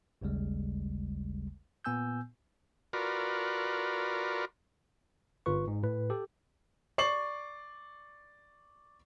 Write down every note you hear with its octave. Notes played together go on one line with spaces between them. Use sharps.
A1 D#2 C#3 G3 G#3
A#2 B3 G#5 E6 G6
F4 F#4 A#4 B4 D5
G1 F4 B4 C#6
G#2
A2 B4
G4 A4
D5 C#6 C7 F#7